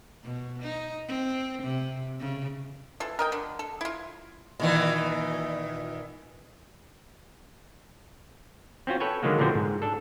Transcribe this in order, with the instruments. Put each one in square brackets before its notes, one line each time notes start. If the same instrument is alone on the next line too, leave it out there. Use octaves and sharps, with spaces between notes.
[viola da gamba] B2
D#4
C4
C3
C#3
[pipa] E3 F4 A4
A#4 D#5 G5
D3
A4
E4 F4
[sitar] A#2 D#3 E3
[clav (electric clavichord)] C4 C#4 F4 F#4
A4 B4 C#5 G5 G#5
D3 D#3 F#3 G#3 A#3
A#2 D3 E3 F3 C4 F#4
G#2
D4 A4